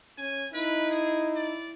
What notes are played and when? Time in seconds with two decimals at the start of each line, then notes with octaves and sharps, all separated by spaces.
0.18 C#4 G#5
0.54 D#4 E4 B4
0.91 G#4
1.36 D5